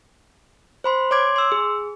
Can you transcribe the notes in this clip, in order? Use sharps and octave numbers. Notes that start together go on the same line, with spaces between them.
C5 B5 C6
C#5 C6 D6 G#6
C6 E6
G#4